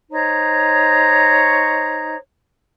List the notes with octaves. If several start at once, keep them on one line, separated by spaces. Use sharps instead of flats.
D#4 C5 C#5 A#5